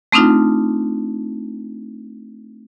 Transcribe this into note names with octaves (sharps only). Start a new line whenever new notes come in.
A3 C4 D4 D#4 F4